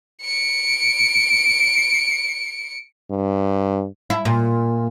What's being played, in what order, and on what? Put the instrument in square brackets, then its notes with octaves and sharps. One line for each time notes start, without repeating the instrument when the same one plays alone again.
[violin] C#7 D7
[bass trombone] G2
[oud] E4
A#2